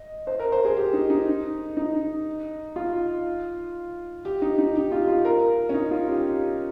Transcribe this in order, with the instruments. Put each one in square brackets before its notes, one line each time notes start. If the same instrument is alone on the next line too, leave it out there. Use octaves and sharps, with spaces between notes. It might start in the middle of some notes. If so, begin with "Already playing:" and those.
Already playing: [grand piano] D#5
C5
A#4
C5
G#4
G4
D#4
D#4
D#4
F4
G4
D#4
D#4
G4
F4
F4
A#4
C#4
D#4
F4
G4